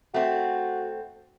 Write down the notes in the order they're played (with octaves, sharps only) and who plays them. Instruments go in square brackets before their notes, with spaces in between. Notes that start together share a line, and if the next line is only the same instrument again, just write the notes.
[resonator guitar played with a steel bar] A3 C4 [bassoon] F#4